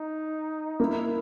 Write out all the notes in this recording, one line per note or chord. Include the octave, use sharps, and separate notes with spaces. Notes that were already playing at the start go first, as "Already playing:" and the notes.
Already playing: D#4
A#3 E4